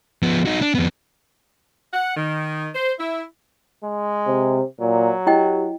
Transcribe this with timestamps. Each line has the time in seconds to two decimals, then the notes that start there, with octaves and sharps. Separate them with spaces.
0.23 F3 B3
0.46 D#4 F#4
0.62 D4
0.75 F2 B3
1.93 F#5
2.16 D#3
2.74 C5
2.99 E4
3.84 G#3
4.27 C3
4.81 A#2 F#3
5.27 E4 G4 D#5 G5